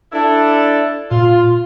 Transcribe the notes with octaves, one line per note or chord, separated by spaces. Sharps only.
D4 E4 A4
A#2 F4